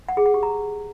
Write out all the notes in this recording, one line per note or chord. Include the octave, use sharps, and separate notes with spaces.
F#5
G#4
F#5
G4
A#5